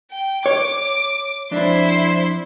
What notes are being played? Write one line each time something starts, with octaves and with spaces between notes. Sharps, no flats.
G5
C#5 D6
F2 D4 E4 C5